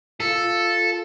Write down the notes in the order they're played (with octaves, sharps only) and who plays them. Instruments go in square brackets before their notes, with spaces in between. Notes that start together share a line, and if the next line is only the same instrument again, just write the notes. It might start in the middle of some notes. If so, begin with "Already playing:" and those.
[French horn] F4 [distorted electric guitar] A4